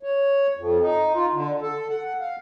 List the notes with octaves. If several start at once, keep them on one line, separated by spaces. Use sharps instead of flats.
C#5
F2
D#4
F4
D3
A4
F#5
F5